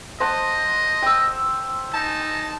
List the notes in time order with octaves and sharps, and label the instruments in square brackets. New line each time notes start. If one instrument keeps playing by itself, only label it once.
[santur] C5 F#5 A5 [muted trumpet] D#5
[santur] G5 E6
[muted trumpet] D#4 [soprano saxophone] A5